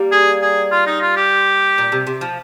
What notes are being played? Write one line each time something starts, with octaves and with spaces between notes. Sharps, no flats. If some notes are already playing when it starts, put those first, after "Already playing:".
Already playing: G3 A#3
G#4
G#4
F4
D#4
F4
G4
A#2
C3
C3
F3